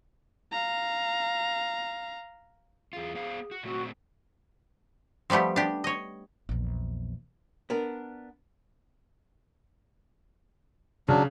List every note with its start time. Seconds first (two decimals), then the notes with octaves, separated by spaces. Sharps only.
0.52 F5 A#5
2.93 E2 F4 G#4
3.15 B3 C5 F5
3.51 F#4
3.63 A#2 A3 C4 F#4
5.30 F3 G3 A3 B3 G4
5.56 D4 G4
5.84 C#5 D#5
6.49 A#1 E2
7.70 B3 D4 A#4
11.08 C#3 F#3 D4